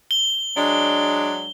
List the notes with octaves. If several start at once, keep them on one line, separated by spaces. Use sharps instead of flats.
G7
F#3 G#3 D4